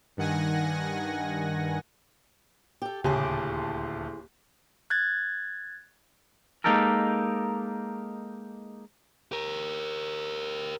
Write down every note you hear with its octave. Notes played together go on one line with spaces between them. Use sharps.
G2 D#3 F#5 G#5 A#6
G4 A4
D#1 D2 A2 C#3 G4 G#4 A5
F#6 G#6 A6
G#3 A#3 D#4 G4 A4 A#4
G4 A#4